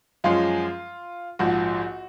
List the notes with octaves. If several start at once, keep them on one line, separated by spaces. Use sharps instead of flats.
F#2 F3 G#3 C#4 F4
A#1 G#2 F3 F#4